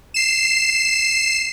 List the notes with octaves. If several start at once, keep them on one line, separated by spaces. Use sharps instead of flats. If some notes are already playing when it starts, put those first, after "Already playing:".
C7 E7